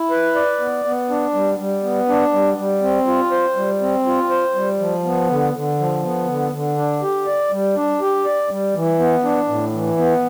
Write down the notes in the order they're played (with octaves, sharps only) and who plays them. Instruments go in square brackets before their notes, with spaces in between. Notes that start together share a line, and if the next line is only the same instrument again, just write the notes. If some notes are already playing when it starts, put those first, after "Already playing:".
Already playing: [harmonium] E4
B4
D5
B3
B3
D4
G3
G3
B3
D4
G3
G3
C4
F4
C5
G3
C4
F4
C5
G3
F3
B3
D3
D3
F3
B3
D3
D3
D4
G4
D5
G3
D4
G4
D5
G3
E3
B3
D4
A2
E3
B3